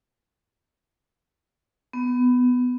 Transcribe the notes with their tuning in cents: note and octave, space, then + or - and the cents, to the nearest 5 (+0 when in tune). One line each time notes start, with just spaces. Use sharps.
B3 +10